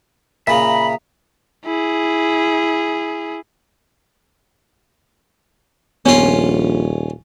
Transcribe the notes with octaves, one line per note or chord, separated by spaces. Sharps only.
A#2 C#3 E5 A#5 B5
E4 G#4
D#1 A#1 B3 C#4 F4